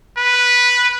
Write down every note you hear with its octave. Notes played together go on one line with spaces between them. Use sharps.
B4